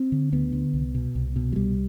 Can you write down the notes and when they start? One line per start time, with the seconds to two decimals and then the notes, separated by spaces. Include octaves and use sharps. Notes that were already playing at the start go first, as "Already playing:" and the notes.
Already playing: C4
0.12 D3
0.32 D2 B3
0.52 D3
0.73 C2
0.95 B2
1.15 C2
1.36 B2
1.53 F#3
1.56 C2 G3